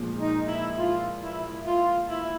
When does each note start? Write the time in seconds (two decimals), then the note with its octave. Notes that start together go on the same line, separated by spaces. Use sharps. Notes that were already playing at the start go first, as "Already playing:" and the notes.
Already playing: A#2 F3 G#3
0.18 D#4
0.47 E4
0.77 F4
1.21 E4
1.65 F4
2.09 E4